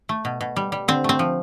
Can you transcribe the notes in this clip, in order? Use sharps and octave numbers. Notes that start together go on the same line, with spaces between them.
A3
B2
B2
G3
G3
D3 C4
A3 C4
F3